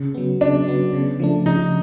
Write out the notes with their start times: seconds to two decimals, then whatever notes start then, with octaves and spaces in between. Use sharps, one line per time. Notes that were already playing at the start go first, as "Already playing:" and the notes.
Already playing: C#3
0.14 F#3 B3
0.41 C#3 D4
0.68 F#3 B3
0.93 C#3
1.20 F3 A3 D4
1.46 C#3 D#4